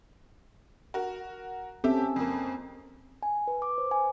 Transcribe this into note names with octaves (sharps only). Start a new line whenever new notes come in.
F#4 A#4
C4 C#4 G4 A4 E5
F2 A#3
G#5
B4
D6
C5
G#5